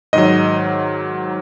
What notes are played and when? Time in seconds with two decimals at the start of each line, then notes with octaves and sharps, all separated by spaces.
0.13 G#2 D#3 F#3 D#5